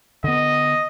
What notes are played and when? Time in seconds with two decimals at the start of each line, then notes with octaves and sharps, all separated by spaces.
0.24 D3 B3 D#5